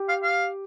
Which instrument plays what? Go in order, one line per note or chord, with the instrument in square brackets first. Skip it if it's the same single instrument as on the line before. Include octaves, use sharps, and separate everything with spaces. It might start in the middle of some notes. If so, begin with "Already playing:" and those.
Already playing: [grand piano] G4
[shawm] F5
F5